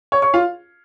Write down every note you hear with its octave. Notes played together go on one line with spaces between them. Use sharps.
C#5 C#6
C#5 C#6
F4 F5